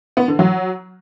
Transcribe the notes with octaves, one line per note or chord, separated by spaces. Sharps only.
B3
D3
F#3